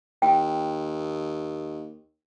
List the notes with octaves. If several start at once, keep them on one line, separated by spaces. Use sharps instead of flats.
D#2 G5